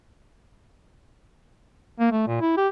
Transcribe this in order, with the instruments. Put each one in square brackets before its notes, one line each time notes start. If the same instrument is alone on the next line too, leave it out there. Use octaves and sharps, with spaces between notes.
[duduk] A#3
A3
A#2
E4
G4